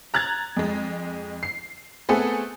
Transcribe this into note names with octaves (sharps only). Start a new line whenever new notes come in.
A#5 F#6 G#6 A6
F2 G#3
C7
A3 B3 C4 G#4 A4